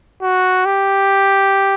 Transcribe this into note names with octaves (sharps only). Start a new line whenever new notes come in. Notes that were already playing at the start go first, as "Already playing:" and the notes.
F#4
G4